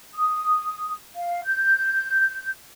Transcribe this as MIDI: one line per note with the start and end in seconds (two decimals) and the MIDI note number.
0.15 0.92 87
1.15 1.41 77
1.45 2.48 91